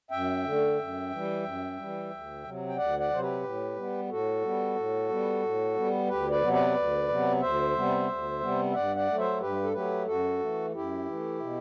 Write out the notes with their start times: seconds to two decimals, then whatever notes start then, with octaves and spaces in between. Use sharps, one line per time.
0.11 F#2 E5 G5
0.44 D3 A3
0.78 F#2
1.11 E3 G3
1.44 F#2
1.77 E3 G3
2.10 D2
2.44 C3 F#3
2.68 G5
2.76 D2 D5 F#5
2.98 D5 F#5
3.10 C3 F#3 C5
3.21 G4 B4
3.43 A2
3.76 G3 B3
4.09 A2 F#4 A4
4.42 G3 B3
4.76 A2
5.09 G3 B3
5.42 A2
5.76 G3 B3
6.08 D2 G4 B4
6.30 B4 D5
6.41 C3 F#3 B3
6.53 B4 D5
6.75 D2
7.08 C3 F#3 B3
7.41 D2 C5 E5
7.75 C3 G3 B3
8.08 D2
8.41 C3 G3 B3
8.70 E5
8.73 G2 D5 F#5
8.95 D5 F#5
9.07 F#3 A3
9.18 C5 E5
9.40 G2 G4 B4
9.63 A4
9.73 F#3 A3 G4 B4
10.06 F#2 F#4 A4
10.39 E3 A3
10.73 F#2 E4 G4
11.06 E3 A3
11.40 B2